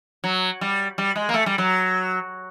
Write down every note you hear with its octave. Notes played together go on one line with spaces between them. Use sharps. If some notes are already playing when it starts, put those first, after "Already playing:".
F#3
G3
G3
G#3
A#3
A3
G3
F#3